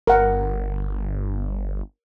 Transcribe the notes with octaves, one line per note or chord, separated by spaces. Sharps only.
G1 A#4 F#5